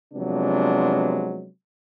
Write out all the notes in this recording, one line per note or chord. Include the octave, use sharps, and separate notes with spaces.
C3 F3 F#3 G#3 B3 D4